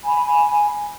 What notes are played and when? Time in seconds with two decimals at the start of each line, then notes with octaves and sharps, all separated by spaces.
0.04 G#5 B5